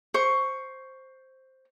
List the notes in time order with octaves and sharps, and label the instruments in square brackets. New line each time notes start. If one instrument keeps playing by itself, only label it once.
[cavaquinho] C5 C#6